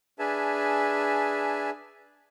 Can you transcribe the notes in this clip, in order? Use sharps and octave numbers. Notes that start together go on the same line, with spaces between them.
D4 G#4 B4 E5 G#5 A5